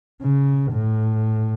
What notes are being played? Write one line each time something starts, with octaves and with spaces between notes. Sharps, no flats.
C#3
A2